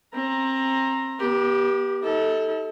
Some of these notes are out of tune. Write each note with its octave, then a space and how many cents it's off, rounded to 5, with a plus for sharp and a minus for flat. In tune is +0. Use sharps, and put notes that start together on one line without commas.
C4 +25 A#5 +0
B3 -40 G4 +0
D#4 +45 A4 +0